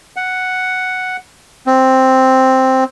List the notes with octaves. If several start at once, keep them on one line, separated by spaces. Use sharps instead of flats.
F#5
C4